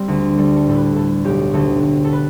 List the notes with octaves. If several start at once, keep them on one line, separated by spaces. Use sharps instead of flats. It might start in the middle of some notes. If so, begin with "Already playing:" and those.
Already playing: G3 C4
D2
G3 A4
A4
A2 A4
B4
A2 A4
B1 G4
D2 A4
D2
A4
B4